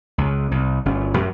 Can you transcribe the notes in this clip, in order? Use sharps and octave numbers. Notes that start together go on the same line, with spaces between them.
C#2
C2
G1 C#4
F#2